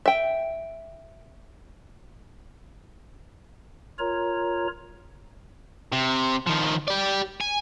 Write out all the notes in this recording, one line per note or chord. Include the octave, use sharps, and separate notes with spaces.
E5 G5
F4 A#4 C#5 A#5
C3
D#3 F3
G4 D5
G#5